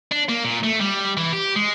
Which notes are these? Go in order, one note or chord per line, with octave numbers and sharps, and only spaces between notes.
D4
A#3
A#2
A3
G3
E3
G4
G#3